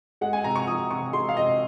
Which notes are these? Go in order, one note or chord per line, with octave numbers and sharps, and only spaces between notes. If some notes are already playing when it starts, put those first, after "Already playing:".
G#3 F#5
G#5
C3 A#5
C#6
F3 D#6
C3 C#6
G#3 C6
F5
C3 D#5